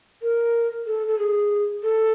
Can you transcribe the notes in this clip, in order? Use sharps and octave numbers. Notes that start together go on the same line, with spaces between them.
A#4
A4
A4
G#4
A4